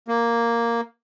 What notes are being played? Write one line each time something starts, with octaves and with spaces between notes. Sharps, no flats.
A#3